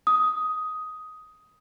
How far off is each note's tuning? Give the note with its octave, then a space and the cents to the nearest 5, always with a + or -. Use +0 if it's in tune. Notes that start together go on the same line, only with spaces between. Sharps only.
D#6 +10